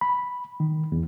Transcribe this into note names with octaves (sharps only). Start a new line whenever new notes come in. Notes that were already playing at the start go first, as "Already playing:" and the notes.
B5
D#3
E2